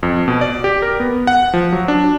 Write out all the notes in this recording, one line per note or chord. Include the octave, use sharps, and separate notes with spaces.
F2
B2
D5
G4
A#4
B3
F#5
F3
F#3
D4